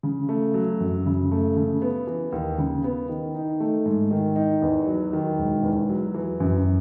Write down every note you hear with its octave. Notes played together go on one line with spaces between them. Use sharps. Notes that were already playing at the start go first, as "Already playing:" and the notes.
C#3
A3
F#3
F#2
C#3
A3
C#3
B3
E3
D#2
C#3
B3
D#3
D#4
A3
G#2
D#3
D#4
E2
F#3
D#3
E1
E2
F#3
E3
F#2